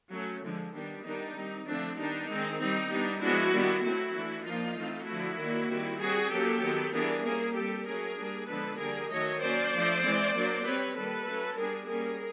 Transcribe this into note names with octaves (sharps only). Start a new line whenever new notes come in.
F#3 A3 C#4
D3 F3 G#3
D#3 G3 B3 D4
D#3 G3 B3 D4 D#4
G3 C4
D3 F3 A3 C4 D4
D#3 G3 B3 D4 D#4
D#3 G#3 C4
G3 C4 D#4
G3 B3 D4
F3 G#3 B3 D4 E4 F#4
D#3 G3 B3 D4
F#3 A3 C4 E4 F#4
E3 A3 D4
F3 A#3 D4 D#4 F4
E3 A3 C4
D3 F3 A3 E4 F#4
D#3 F#3 A#3 D4
D#3 G3 C4
G3 C4 F#4 G#4
F#3 A#3 C#4 G4 A4
D#3 F#3 B3
E3 G3 B3 D4 G#4 A#4
G3 A#3 C#4 G#4 A#4
G3 C4 G4 A4
F#3 A3 C#4 G#4 A#4
G3 A#3 D4
D3 F3 G#3 B3 D4 A4 B4
D3 G3 A#3 G#4 A#4
D#3 F#3 A3 C#5 D#5
F#3 A#3 C#4 C5 D5
F3 A3 D4
E3 G#3 C4
F#3 A#3 D4
G3 C4 B4 C#5
D#3 G3 A#3 A4 B4
F#3 A3 C#4
G3 B3 D4 G#4 A#4
G3 A#3 C#4 G#4 A#4